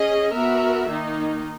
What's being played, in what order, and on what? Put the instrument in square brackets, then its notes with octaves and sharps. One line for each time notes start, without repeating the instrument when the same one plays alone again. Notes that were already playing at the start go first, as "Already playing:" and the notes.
Already playing: [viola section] C#4 G#4 D#5
B3 F#4 A#4 E5
D#3 A#3 D#4